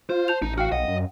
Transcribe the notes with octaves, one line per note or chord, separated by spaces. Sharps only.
F4 C5
A5 G6 F7
A1 D#4
F#4 F5 G5 F6
B1 D#5 F#5
F#2